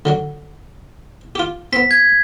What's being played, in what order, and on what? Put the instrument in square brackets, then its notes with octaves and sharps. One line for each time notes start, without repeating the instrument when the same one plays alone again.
[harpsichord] D3 F#3 F#4
F4 G4
[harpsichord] B3 C4 [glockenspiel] B6
[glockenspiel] G#6